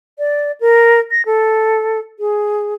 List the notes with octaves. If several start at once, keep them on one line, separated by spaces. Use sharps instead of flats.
D5
A#4
A#6
A4
G#4